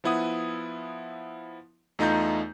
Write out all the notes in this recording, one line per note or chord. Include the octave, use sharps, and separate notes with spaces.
F3 B3 E4 F#5 D#6
E2 A3 D#4 F4 A#5 G6